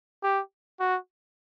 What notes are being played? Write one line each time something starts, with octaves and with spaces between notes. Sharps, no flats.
G4
F#4